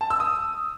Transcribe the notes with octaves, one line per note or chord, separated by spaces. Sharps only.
A5
E6
D#6